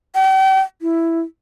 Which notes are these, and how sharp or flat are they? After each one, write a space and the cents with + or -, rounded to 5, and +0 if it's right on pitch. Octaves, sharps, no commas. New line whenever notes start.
G5 -40
E4 +5